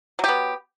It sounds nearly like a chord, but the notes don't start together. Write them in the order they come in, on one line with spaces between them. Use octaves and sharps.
F#3 G4 B3